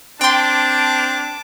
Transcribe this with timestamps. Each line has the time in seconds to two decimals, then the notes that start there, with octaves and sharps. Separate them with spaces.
0.21 C4 D4 G5 A5 C6 D6